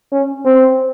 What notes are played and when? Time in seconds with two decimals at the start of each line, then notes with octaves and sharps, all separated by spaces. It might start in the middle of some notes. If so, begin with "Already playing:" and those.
0.12 C#4
0.45 C4